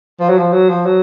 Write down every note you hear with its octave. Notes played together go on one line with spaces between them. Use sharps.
F3
F#3
F3
F#3
F3
F#3